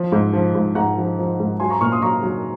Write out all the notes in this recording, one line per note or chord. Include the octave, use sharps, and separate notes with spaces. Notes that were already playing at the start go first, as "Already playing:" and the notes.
Already playing: F3
G#2
F3
G#2
G#2 F#5 A#5
F3
F3
G#2
F#3 G#5 C6
A#5 C#6
A#2 C#6 F6
C6 D#6
F#3 A#5 C#6
F#3